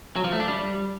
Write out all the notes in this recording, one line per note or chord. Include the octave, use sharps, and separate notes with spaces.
F#3
F3
A3
D4
G3